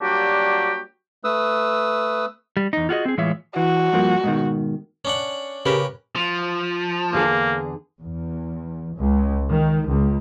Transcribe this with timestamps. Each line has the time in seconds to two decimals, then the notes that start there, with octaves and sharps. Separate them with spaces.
0.01 F#3 G3 A#3 D4 F#4 G4
1.24 A3 B4 D#6 E6
2.57 G3
2.73 E2 D#4
2.89 F4 F#4 G#4 D#5
3.05 C4 G#4
3.17 A2 E3 G#3 F4 C#5 E5
3.56 E3 F#4
3.93 G2 F3 A#3
4.24 G#2 B2 D#3
5.05 C#4 D4 F#5
5.66 C#3 C#4 G4 A#4 B4
6.15 F3
7.13 E2 D3 A#3 G#4
8.00 E2
8.96 C#2
9.51 D#3
9.87 C#2